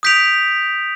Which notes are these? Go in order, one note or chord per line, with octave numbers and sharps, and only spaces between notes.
D#6 G6 B6 D7 F7